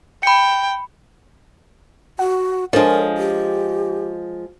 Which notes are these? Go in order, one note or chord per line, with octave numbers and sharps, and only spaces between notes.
G5 B5 C#7
F#4 F#5
F3 G#3 D4 A4 A#4 C#5
G4